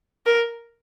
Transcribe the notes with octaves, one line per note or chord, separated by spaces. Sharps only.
A#4